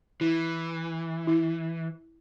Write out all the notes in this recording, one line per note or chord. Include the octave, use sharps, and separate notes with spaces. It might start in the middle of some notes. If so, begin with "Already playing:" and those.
E3 E4
E4